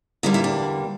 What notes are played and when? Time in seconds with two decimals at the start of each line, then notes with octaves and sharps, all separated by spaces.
0.23 E2 D3 G3 A#3 C#4 E4
0.34 E4
0.44 D4